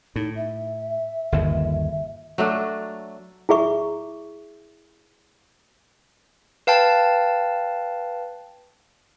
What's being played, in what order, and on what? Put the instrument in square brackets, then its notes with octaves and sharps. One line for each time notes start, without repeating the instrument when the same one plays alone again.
[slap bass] A2 [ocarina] D#4
[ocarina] E5
[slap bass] G1 D#2 C#3
[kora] F#3 A3 D4
[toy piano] E4 G#4 E5 C#6
[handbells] B4 F5 G5 A5